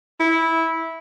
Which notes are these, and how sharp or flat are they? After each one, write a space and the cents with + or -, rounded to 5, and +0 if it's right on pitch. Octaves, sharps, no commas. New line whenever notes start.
E4 -15